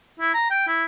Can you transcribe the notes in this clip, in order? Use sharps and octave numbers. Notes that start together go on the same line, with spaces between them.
E4
A#5
G5
E4